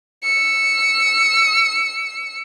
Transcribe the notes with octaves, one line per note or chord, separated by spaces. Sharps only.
E6 C#7